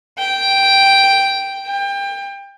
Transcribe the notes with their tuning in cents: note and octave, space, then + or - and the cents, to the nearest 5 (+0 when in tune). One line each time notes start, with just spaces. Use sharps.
G5 +0
G5 +25